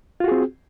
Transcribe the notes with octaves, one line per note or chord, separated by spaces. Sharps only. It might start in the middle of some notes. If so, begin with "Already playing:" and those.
C4 F4 F#4 G#4